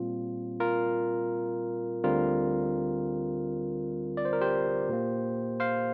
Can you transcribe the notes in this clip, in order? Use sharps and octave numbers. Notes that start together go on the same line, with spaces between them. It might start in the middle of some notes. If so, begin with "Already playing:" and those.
Already playing: A#2 G3 C4 F4
F4 A#4
D2 D3 G3 C4 F4 A#4
D5
C5
A#4
G4 C5
A#2 A#3
C5 F5